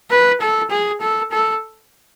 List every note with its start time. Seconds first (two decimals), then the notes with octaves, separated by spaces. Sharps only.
0.11 B4
0.41 A4
0.71 G#4
1.01 A4
1.31 A4